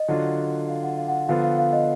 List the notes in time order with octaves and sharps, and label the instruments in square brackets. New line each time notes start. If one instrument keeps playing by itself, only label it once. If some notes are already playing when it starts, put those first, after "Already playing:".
Already playing: [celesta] D#5
[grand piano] D3 F#3 D4 F4
[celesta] F5
F#5
F5
F#5
[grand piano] D3 F3 B3 F4 [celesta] F5
[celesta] F5
F5
D#5